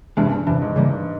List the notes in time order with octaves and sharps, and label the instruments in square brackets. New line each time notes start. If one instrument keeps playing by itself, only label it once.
[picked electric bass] E2 C3 E3 G#3 [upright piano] G2
[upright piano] G2
[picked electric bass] E2 C3 E3 [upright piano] G2
[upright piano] G#2
[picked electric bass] C#3 E3 G3 A#3